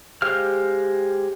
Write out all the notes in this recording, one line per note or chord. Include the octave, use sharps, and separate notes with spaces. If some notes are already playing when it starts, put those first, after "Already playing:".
G#3 G4 C5 F5 F6